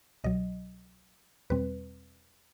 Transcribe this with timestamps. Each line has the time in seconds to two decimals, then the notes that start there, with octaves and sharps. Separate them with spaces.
0.24 C2 B2 F#3 D#5
1.50 E2 B2 G3 C4 B4